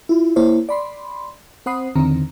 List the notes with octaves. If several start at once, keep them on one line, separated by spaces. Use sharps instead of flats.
E4 F4
A#3 E4 C5 C#5
D5 B5 C6
C4 C5 F#5 B5 D#6 C7
E2 D3 D#3 C4 A#5